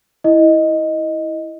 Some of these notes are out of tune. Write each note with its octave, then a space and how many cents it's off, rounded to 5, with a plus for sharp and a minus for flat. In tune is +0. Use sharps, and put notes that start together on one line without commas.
E4 -10 D#5 +0